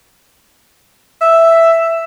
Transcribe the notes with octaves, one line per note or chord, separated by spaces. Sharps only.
E5